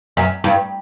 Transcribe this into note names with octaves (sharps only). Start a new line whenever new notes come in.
F#2
G2